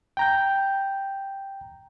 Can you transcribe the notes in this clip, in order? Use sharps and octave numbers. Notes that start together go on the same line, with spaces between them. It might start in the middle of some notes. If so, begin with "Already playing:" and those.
G5 A#5 G6